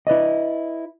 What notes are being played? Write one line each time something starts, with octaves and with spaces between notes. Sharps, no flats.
E4 B4 D5 D#5